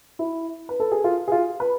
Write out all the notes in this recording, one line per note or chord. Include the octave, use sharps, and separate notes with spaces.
E4
B4
A4
G#4
F4
G#4
F4
B4